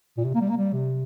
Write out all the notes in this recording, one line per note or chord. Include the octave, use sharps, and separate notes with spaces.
A#2
C3
A#3
G3
A#3
G3
C3